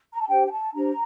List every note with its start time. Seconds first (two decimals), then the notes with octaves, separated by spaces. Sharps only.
0.12 A#5
0.20 A5
0.28 D4 G4 C5 G5
0.46 G5
0.52 A5
0.74 D4 G4 C5 A#5